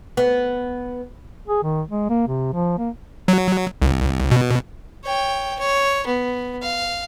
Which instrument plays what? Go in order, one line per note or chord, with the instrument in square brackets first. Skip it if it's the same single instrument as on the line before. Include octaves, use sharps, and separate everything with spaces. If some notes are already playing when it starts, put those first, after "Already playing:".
[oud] B3
[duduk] G#4
D#3
G#3
A#3
C3
F3
A#3
[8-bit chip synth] F#3
C2
B2
[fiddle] C#5 G5
C#5
B3
F5